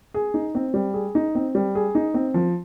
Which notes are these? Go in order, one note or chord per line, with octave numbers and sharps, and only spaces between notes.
G#4
D#4
C4
G3
G#4
D#4
C4
G3
G#4
D#4
C4
F3